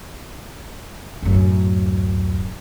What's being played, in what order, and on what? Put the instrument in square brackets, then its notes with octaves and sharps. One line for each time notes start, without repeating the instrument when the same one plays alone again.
[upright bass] D1 F#2